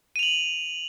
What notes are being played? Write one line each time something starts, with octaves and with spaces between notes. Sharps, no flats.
D#7 F7 F#7